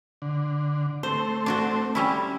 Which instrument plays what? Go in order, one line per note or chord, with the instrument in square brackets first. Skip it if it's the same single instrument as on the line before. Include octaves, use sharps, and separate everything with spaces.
[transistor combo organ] D3
[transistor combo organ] A3 C4 [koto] C5
[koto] D4 F#4 C5
G3 C#4 E4